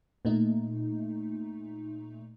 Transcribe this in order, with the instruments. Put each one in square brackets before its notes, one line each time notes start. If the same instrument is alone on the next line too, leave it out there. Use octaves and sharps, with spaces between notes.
[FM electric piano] A#2 A3 D#4